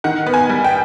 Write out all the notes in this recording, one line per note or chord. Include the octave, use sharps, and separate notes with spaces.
D#3 F#5
B3
G#5
G3
G5